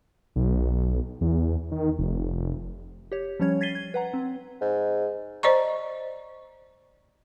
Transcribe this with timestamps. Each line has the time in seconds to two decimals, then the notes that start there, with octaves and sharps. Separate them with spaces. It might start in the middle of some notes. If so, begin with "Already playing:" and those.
0.36 B1
1.21 E2
1.71 D#3
1.98 F1
3.12 G4 C#5
3.40 F3 G3 C#4 C#5 G#6
3.61 G#6 A6 B6 C7 D#7 G7
3.75 G#6
3.94 B4 F#5 A#5
4.14 C4
4.61 G#2
5.43 C5 D5 D#5 A#5 C#6